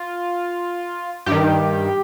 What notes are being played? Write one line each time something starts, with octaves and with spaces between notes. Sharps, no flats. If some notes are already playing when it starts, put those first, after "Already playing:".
Already playing: F4
G2 D#3 G4